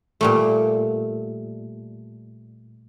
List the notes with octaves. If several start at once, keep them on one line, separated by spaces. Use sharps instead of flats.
A#2 G3 A3